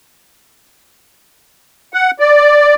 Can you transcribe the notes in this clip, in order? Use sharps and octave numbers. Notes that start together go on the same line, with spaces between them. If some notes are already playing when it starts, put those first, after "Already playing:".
F#5
D5